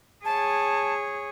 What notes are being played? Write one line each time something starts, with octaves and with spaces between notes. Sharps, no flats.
G#4 C#5 A5